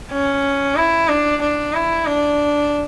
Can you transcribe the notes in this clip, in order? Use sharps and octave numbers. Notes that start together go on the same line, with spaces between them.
C#4
E4
D4
D4
E4
D4